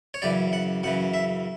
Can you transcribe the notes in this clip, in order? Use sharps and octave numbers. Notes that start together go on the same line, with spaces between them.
C#5
F#2 C#3 E3 D5
F#5
F#2 C#3 E3 F#5
E5